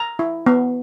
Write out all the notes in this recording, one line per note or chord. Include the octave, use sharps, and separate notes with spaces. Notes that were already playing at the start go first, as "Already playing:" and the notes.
Already playing: A#5
E4
B3